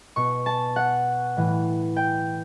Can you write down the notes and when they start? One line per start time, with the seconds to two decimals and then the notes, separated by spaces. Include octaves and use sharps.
0.16 B2 C#6
0.46 A5
0.76 F#5
1.37 A2 E3
1.96 G5